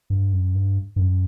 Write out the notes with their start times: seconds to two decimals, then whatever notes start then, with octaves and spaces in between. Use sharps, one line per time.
0.10 G2
0.33 F#2
0.55 G2
0.96 G2
0.99 F#2